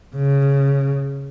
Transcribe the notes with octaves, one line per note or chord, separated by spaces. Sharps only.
C#3